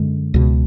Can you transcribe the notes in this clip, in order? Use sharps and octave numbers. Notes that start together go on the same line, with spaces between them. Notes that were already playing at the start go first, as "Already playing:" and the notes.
Already playing: F#2 D3 G#3
C#2 B2